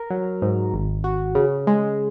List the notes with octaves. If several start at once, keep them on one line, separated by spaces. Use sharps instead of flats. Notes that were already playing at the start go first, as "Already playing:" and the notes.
Already playing: A#4
F#3
G#2
G#1
F#4
C#3
G#3